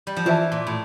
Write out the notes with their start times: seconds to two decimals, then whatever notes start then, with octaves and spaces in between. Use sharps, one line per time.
0.07 G3
0.16 F3
0.26 E3 F4 C5 E5 A5
0.52 A#2
0.67 A2